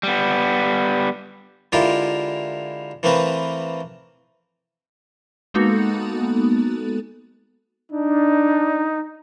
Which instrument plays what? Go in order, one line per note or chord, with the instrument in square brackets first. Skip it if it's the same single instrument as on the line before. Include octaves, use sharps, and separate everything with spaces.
[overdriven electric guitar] G3 B3
[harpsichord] D3 G#3 E4 F4 G4 A#4
E3 A3 A#3 C4 B4
[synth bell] G#3 A#3 B3 D#4 F#4 A4
[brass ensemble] D4 [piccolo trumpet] D#4